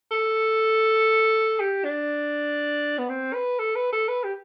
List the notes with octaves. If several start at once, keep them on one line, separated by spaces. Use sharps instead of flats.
A4
G4
D4
B3
C4
B4
A4
B4
A4
B4
G4